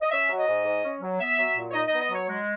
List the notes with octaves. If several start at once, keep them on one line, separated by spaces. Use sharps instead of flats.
D#5
C#4 E5
F#3
D#5
G#2
G#2
C#4
F#3
B3 E5
F#3
A#2
C#5
D#4 D#5
B3 D#5
D#5
F#3 C#5
G#3